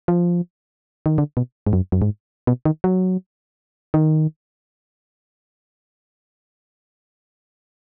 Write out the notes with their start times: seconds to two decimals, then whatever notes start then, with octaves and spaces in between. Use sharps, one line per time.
0.08 F3
1.06 D#3
1.18 D3
1.37 B2
1.67 G#2
1.73 F#2
1.92 F#2
2.02 G#2
2.47 B2
2.65 D#3
2.84 F#3
3.94 D#3